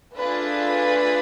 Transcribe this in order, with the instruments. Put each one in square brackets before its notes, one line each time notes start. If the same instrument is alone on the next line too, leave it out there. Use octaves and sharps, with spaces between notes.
[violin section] A3 D4 F4 G#4 B4